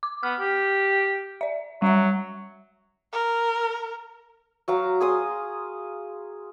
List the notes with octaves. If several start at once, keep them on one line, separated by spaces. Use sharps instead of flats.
D6
B3 F6
G4
D5 E5
F#3 G3 E5
A#4
F#3 F5 A#5
G#4 C6 D#6